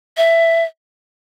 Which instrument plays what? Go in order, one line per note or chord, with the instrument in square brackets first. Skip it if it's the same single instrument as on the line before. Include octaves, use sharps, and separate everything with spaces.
[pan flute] E5